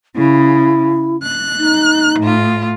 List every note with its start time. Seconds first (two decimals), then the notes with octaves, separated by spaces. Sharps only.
0.16 C#3 E4
1.22 F#6
1.58 D#4
2.20 A2 F4